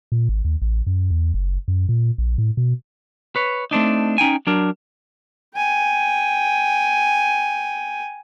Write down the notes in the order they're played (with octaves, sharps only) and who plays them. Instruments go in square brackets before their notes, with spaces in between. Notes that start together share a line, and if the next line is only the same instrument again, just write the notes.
[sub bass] A#2
G#1
D#2
A1
F#2
E2
F#1
F#2
A#2
A#1
A2
B2
[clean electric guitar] B4 C#5
A3 C4 D4 D#4
C#4 D#4 G5 G#5
F#3 D4 A#4
[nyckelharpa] G5 G#5